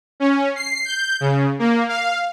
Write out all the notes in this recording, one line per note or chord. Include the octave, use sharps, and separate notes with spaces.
C#4
C7
G6
C#3
A#3
F5